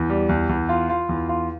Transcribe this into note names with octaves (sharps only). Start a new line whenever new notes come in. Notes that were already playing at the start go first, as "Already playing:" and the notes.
Already playing: E2
G3
E2
E2
F4
F4
E2
F4